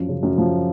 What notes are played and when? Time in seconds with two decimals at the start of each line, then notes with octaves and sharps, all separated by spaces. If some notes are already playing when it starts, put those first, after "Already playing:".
Already playing: F#2 F3
0.08 C#3
0.23 F#2
0.38 F3